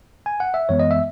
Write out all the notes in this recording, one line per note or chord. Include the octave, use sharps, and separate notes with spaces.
G#5
F#5
E5
F#2 E3 G#3 B3 C#5
D#5
E5